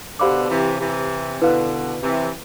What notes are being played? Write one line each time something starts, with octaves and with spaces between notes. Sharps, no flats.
B2 D3 G4 C5 F5 B5 D6
C3 E3
C3 E3
B2 D3 E4 B4 F5
C3 E3